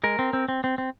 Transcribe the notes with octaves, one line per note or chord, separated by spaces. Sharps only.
G#3 A#4
C4
C4
C4
C4
C4